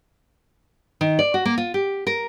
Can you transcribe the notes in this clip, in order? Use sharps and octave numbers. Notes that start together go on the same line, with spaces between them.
D#3
D5
F#4
A#3
F4
G4
A#4